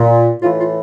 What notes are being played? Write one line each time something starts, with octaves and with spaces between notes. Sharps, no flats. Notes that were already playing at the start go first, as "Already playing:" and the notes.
Already playing: A#2
A2 E3 F4
F4